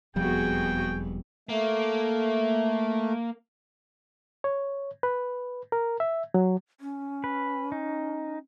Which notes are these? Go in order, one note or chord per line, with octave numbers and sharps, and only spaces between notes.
E1 F2 F3 G3 B3 F#4 G#4 G5
A3 A#3
C#5
B4
A#4
E5
F#3
C#4
B4
D#4